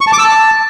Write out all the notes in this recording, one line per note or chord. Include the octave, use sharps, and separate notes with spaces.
C#6
A5
D6
E6
A5